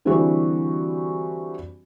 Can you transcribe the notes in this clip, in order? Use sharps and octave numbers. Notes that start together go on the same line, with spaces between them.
D3 E3 G3 C4 F#4 G4